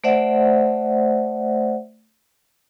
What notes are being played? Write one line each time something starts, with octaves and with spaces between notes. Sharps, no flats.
A3 C5 D5 E5 F#5